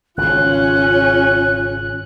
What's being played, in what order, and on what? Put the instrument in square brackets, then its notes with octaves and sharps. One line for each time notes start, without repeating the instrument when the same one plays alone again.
[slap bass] G#1 C#3 [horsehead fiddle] C#4 F4 [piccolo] F#6